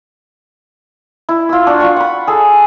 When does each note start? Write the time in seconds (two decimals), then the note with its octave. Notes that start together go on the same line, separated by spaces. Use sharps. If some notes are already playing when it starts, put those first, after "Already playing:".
1.29 E4
1.49 F4 E6
1.67 D4 F#4
1.80 F4 G5 C#6
1.96 F#5 B5
2.27 G#4 A4